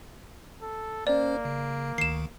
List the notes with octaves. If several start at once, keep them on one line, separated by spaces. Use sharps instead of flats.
A4
A#3 C#4 C5 D5
C#3
D2 D#3 C7 E7